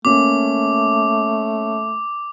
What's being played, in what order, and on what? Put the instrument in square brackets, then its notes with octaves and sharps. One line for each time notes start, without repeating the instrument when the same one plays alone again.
[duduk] A3 [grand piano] A#3 C#4 [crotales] D6